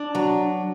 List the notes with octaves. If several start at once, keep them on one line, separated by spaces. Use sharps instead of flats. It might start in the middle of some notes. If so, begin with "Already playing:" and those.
Already playing: D4
F#3